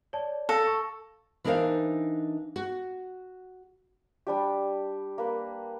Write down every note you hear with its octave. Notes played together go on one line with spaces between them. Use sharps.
C#5 D5 A5
A4 F5 A#6
C#6
E3 D4 D#4 A#4 C5 F5
F#4
G3 D4 G4
A#3 B4